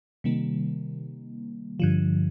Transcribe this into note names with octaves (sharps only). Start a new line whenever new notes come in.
C3 D#3 G3 A#3
G2 D3 F3